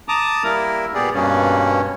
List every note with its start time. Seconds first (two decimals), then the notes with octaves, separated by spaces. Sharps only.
0.08 A5 A#5 D6 D#6
0.44 G3 A#3 E4 A#4
0.94 A#2 B3 G4 G#4 D5
1.14 G2 B2 G3 A#3 C#4